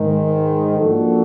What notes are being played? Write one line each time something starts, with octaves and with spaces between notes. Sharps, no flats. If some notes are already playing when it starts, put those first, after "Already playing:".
Already playing: G#2 D#3 G#3
F3 A#3 D4 F#4 A4